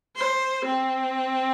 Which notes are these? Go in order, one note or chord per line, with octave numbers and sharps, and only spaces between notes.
C5
C4